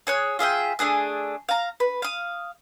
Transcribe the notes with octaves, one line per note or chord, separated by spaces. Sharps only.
G#4 C#5 F#6
F4 G#4 E5 G5
A3 D4 G#4 F#6
F5 A#5
B4
F5 D#6